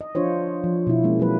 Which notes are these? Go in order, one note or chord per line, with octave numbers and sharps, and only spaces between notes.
D#5
F3 D4 F4 C5 C#5
F3
B2 E4
G#3 A#3 C#4
F#3 A#3 C4 B4